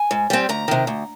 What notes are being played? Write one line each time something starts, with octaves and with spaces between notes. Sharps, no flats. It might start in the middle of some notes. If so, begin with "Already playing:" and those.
Already playing: G#5
G#2
G3 C4
D2 A#5
C3 D#3
D2